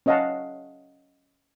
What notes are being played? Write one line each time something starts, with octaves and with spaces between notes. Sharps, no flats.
C#4 C#5 D#5 F5 F#5 A5